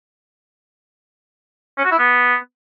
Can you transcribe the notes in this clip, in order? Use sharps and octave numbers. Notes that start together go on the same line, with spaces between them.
C#4
F#4
E4
B3